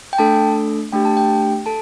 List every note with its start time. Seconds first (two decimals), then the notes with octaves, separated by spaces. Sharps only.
0.13 G5
0.18 A3 D4 A4 A5
0.93 A3 D4 G4 G5
1.05 A5
1.17 G5
1.66 A4 A5